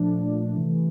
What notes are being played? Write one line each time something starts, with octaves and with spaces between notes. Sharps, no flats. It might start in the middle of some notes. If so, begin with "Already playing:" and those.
Already playing: A#2 F3 A3 D4
C3 E3 A3